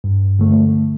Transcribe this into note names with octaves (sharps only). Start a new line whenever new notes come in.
G2
D3 A3